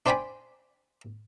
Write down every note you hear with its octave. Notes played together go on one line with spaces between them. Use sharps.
D4 C5 D5 G5 G#5 B5